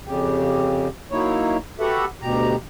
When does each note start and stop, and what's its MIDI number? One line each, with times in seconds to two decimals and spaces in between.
0.05 0.88 41
0.05 0.88 49
0.05 0.88 67
1.11 1.57 54
1.11 1.57 58
1.11 1.57 63
1.11 1.57 64
1.11 1.57 73
1.80 2.05 66
1.80 2.05 67
1.80 2.05 69
1.80 2.05 71
1.80 2.05 76
1.80 2.05 78
2.22 2.55 38
2.22 2.55 47
2.22 2.55 67
2.22 2.55 82